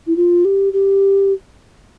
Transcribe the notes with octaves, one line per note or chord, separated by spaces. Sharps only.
E4
F4
G4
G4